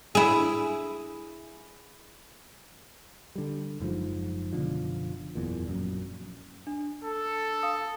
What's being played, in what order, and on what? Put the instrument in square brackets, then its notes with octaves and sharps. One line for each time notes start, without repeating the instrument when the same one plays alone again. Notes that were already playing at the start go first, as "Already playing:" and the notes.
[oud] E4 G#4
[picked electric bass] D3 G3
F#1 G#2 C#3 F3
F#1 B2 D3 F3
F#1 E2 A#2
A#1 F#2
[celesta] D4
[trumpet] A4
[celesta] F5 D#6